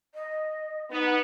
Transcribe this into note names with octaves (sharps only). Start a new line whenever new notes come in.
D#5
B3 D#4